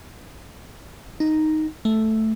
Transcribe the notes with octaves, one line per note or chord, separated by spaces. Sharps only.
D#4
A3